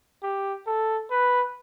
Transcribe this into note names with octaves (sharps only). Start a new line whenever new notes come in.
G4
A4
B4